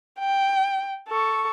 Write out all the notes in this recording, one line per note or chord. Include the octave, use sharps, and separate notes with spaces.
G5
A4 C#6